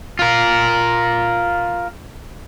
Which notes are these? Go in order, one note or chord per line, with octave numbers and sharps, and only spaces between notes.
F4 A#4